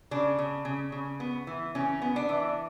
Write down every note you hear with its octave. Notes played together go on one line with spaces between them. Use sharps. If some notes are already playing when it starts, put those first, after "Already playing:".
C#3 D4
C#3
C#3
C#3
B3
E3
C#3 C#4
B3
D4
E3